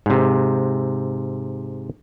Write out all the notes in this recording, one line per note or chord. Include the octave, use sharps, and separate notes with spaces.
G#2 C3